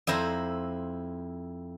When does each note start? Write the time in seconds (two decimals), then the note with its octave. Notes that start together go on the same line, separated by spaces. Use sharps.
0.07 F2 E4 C5 A#5